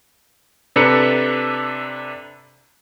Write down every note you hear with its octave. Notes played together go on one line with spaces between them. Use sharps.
C3 D4 A4 B4 A#5 C#7